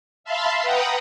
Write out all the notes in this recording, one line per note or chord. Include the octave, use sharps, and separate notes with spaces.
E5 F5 A5 B5 C6
B4 F#5 G5 A#5 D#6